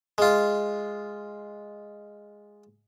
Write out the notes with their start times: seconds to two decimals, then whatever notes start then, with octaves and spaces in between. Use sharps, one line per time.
0.18 G#3 F4